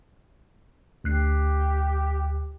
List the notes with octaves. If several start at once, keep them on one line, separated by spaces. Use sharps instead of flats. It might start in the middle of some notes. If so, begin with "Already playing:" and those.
D2 G4 F#6 C7